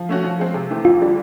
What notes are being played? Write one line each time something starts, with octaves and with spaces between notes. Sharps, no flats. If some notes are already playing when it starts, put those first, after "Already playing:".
Already playing: F3
A3 C#4 F#4
F3
G#3 C4
C3
E3 A3 C4
F2 F4
D3 G3